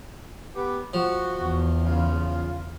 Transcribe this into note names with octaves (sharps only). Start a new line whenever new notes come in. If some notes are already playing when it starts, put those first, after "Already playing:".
B3 G4
F3 F#4
E2
C#3 F4